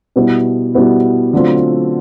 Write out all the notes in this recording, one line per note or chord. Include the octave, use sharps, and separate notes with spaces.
B2 G3 B3 E4
B2 G3 B3 E4
D3 F#3 A3 C4 F4